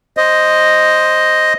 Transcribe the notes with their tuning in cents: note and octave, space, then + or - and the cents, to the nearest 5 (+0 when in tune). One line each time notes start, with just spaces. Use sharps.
C5 +0 D#5 +0